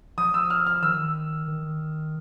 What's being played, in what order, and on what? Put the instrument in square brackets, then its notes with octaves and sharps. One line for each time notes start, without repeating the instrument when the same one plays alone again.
[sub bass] F3 [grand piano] D#6
[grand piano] E6
F6
F6
[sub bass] D#3 [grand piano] E6
[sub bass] D#3